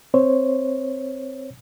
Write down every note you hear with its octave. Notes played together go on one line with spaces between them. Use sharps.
C4 C5 C#5